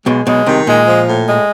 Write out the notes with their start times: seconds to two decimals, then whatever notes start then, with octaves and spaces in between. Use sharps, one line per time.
0.06 B1 B2 G#3
0.27 B1 B2 G#3
0.46 C2 C3 D#3
0.67 A#2 G#3
0.88 F3
1.08 A2
1.28 G#3